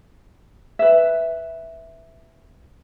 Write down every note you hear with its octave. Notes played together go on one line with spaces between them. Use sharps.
B4 E5